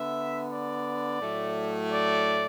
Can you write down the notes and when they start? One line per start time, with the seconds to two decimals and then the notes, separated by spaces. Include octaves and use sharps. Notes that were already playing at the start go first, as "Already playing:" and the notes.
Already playing: D3 B3 E5
0.50 D5
1.21 A2 F#3 A3
1.90 D5